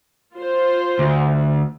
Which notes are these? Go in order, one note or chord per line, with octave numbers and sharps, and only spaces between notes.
F4 C5
D2